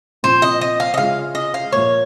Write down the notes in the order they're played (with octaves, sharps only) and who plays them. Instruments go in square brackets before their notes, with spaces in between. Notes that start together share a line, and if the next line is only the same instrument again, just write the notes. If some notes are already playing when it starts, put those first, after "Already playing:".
[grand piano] A#2 F3 C4 F4 [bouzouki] C5
[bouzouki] D#5
D#5
F5
D#5
[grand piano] C#3 G#3 C#4 F4 [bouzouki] F5
[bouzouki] D#5
F5
[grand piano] A#2 F3 A#3 [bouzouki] C#5